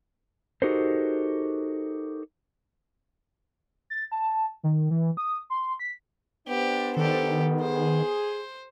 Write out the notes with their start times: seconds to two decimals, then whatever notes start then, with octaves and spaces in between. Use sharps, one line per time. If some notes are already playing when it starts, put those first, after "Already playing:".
0.62 D#4 F#4 G4 A4 A#4 C5
3.90 A6
4.12 A5
4.64 D#3
4.91 E3
5.17 D#6
5.50 C6
5.79 B6
6.48 B3 D4 G4 C5
6.97 D#3 G4 A4
7.62 G#4 C5